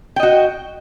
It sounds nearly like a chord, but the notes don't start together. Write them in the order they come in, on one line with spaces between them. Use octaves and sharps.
G5 D#5 F#4